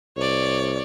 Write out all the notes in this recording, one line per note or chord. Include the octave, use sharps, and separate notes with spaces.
C2 C#5 D5